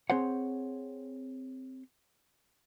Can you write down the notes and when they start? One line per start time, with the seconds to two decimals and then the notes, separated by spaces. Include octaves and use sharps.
0.10 C4 G#4 C5 C#5 F#5